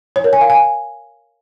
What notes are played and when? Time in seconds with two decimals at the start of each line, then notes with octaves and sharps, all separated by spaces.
0.16 C#5
0.24 A#4
0.33 G#5
0.41 F5
0.50 G#5